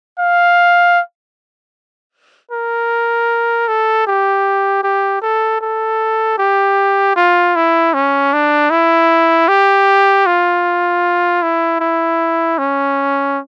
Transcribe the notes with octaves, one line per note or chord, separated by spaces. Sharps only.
F5
A#4
A4
G4
G4
A4
A4
G4
F4
E4
C#4
D4
E4
G4
F4
E4
E4
C#4